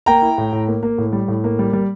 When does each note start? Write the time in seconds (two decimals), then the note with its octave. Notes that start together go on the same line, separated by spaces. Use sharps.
0.06 A#3 G5 A#5
0.22 E4
0.38 A2
0.52 A2
0.68 A#3
0.83 A#3
0.98 A2
1.13 G3
1.28 A2
1.44 A#3
1.59 G3
1.73 G3